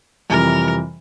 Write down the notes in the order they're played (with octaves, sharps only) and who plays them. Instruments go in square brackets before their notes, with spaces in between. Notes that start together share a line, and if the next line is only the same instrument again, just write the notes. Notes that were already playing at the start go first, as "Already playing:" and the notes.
[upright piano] F2 C3 E3 G3 [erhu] A#4